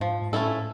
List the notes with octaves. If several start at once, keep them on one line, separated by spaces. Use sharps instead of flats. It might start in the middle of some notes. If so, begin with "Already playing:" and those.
G#2 F3
G#2
A2 A3 C#4 E4 A4